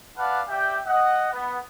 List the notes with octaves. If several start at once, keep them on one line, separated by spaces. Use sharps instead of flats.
B4 D5 F5 F#5 A5
G4 D5 E5 G5
D#5 F#5
B3